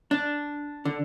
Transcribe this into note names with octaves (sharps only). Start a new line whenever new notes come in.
D4
D3